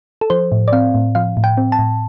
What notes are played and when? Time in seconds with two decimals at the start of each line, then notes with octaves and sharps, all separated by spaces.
0.21 A4
0.30 F3 C5
0.52 A2
0.68 D5
0.72 C4 F5
0.94 A2
1.15 F3 F5
1.37 A2
1.44 G5
1.57 C4
1.72 A5
1.79 A2